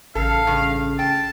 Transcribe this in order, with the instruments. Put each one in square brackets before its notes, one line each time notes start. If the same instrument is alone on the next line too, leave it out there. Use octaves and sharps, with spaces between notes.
[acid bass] A1 [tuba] C#3 [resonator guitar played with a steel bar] A4 [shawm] F5
[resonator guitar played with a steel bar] G2 [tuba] C#3
[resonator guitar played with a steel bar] G5 [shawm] A5